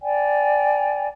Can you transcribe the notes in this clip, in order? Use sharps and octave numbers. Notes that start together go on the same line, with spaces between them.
D5 G5 G#5 A#5